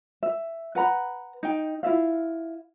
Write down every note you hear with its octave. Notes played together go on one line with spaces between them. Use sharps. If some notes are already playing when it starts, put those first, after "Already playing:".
E5
B4 F#5 A#5 B5
D#4 G5
E4 F4 E5 F5